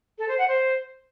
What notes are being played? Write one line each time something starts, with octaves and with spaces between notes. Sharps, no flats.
A4
C5
F#5
C5